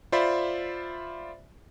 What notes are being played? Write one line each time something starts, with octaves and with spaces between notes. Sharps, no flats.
F4 C5 D5 E5 B5